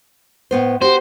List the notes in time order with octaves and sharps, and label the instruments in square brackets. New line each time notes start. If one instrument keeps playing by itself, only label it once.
[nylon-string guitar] A2 B3 C5
[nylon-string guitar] F#4 G4 [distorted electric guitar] C5